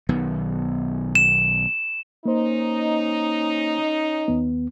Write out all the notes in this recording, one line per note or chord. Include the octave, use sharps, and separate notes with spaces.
B1 D#3 B3
E7
A#3 C#4 D#4 C5
D#2 B3